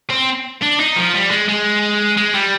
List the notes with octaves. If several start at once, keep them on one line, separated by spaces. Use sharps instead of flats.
C4
D4
D#4
F3
G3
G#3
G#3
G#3
G3